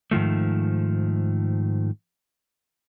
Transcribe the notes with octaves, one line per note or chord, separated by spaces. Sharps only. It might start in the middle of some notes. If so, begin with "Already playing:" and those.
G#2 D#3 F3 A3